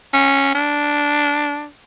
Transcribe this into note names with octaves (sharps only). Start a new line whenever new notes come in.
C#4
D4